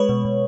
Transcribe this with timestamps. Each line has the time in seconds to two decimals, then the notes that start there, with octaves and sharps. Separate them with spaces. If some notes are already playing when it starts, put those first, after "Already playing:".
Already playing: G#3 B4 C#5
0.09 B2
0.25 B2